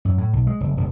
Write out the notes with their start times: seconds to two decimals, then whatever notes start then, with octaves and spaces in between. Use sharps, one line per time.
0.05 F#2
0.18 A2
0.33 B1
0.47 G#3
0.60 F#1
0.77 E1